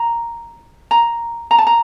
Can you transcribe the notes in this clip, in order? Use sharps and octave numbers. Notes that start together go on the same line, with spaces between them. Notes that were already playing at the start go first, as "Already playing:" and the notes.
Already playing: A#5
A#5
A#5
A5
A#5